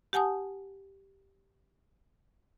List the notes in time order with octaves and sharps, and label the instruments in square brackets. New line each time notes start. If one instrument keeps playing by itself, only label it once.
[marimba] G4 F#5 G#5 A5 D#6